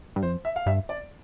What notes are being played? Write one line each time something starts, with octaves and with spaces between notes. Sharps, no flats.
G2
F2 C5
E5
F5
G2 E5
D5